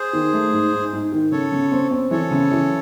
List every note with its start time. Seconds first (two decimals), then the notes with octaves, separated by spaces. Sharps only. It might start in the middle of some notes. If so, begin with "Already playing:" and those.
Already playing: G#4 C5
0.13 D#3
0.33 A3
0.53 G#2
0.73 G#2
0.93 G#2
1.12 D#3
1.32 C#3 A4 C#5
1.52 C#3
1.72 C4
1.91 C4
2.11 E3 A4 C#5
2.31 C#3
2.51 E3